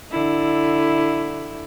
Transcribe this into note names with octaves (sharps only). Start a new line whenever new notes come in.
D3 E4